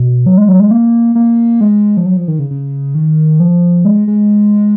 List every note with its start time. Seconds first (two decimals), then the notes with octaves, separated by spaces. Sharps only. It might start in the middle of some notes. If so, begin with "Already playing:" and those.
Already playing: B2
0.26 F#3
0.37 G#3
0.48 F#3
0.60 G#3
0.71 A#3
1.15 A#3
1.61 G#3
1.97 F3
2.06 F#3
2.17 F3
2.28 D#3
2.39 C#3
2.51 C#3
2.95 D#3
3.40 F3
3.85 G#3
4.08 G#3